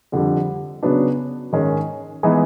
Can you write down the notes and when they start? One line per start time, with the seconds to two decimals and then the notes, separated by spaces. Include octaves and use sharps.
0.12 F2 D3 G3
0.83 C#3 F#3 B3 D4
1.52 G#2 D#3 G#3 C#4
2.23 E3 G#3 B3 D#4